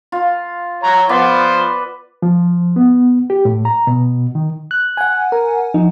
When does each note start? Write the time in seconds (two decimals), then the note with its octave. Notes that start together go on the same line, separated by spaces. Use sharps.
0.12 F4
0.84 C#5 A#5
1.09 F3 B3 F4 B4 C5 D5
2.22 F3
2.76 B3
3.30 G4
3.45 A2
3.65 A#5
3.87 B2
4.35 D#3
4.71 F#6
4.97 F#5 G#5
5.32 A#4
5.74 F3 D#4